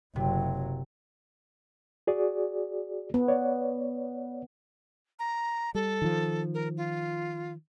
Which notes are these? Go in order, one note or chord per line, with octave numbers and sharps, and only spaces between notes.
F#1 C3 F#3
F#4 G#4 D5
B3
C#5 D5
A#5
G3 A4
D#3 F3
A#4
F4